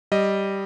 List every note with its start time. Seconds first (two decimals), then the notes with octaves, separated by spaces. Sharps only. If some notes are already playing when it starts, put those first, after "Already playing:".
0.12 G3 D#5